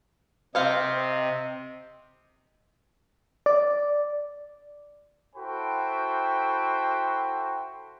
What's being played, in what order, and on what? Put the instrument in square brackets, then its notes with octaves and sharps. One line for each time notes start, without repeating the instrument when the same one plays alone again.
[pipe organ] C3 [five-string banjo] C4 F5 F#5 [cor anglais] D#5
[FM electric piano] D5
[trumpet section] E4 F#4 A4 C5 G5 B5